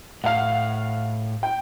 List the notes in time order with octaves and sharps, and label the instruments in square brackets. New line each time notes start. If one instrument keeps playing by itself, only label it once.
[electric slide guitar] A2 [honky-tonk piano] F5 F#5
[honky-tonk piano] G5